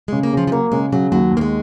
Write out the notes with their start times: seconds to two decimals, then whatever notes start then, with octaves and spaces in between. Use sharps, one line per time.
0.08 C#3 G#3
0.23 A#3
0.33 C#3 F3
0.47 F3
0.52 F#3 A#3
0.72 C#3 G#3
0.92 C#3 F#3
1.12 D#2 F#3
1.31 D#2
1.37 A#3
1.41 G#3